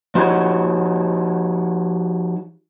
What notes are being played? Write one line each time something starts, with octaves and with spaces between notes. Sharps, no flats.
F3 D#4 F#4 G4 C#5